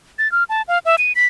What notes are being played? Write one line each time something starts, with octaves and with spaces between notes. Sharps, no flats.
A6
F6
A5
F5
E5
D#7
B6